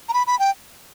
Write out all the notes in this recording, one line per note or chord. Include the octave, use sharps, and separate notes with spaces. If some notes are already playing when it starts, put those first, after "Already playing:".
A#5
B5
B5
G5